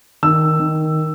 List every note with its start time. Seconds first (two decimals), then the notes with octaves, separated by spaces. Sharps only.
0.23 D#3 E6
0.60 D#3